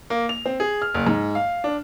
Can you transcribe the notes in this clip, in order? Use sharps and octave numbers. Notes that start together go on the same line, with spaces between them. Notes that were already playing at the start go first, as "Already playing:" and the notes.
A#3
F7
C4
G#4
F6
F#1
G#2
F5
D4